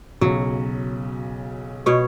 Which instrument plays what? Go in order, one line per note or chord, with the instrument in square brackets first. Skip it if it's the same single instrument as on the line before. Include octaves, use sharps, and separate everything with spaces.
[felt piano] B1 C#3 [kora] F#3
[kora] B2 C#5